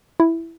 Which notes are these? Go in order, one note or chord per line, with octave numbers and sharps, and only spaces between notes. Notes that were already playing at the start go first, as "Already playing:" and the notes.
E4